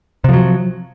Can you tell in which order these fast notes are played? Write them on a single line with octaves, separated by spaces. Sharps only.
C3 F3 F#3